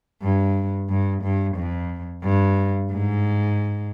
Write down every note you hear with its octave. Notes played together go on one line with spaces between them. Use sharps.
G2
G2
G2
F2
G2
G#2